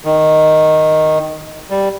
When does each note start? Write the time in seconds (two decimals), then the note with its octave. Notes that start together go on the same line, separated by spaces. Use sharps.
0.04 D#3
1.70 G3